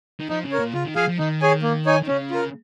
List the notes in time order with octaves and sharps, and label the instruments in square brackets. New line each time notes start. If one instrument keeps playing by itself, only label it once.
[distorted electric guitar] D#3
[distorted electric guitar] F3 [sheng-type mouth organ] D#4
[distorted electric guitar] C#3
[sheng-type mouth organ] A#4 C#5
[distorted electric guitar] A#2
[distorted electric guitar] C#3 [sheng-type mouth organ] F4
[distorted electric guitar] D#3
[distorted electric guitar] F3 [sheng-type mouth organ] G#4 F5 G#5
[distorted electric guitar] F3
[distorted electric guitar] D#3 [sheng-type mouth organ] D#4
[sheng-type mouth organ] G#4 C#5 G#5
A#3
D#4 C#5 G#5
[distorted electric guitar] D#3
[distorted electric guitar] C#3 [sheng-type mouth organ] C#4
[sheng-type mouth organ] F4 A#4